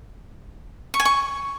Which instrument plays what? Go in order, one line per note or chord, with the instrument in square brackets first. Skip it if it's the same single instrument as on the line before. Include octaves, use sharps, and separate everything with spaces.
[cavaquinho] C#6
G#5
C#6